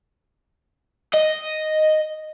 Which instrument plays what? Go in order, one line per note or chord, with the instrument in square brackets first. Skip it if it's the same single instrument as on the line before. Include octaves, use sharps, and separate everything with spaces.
[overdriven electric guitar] D#5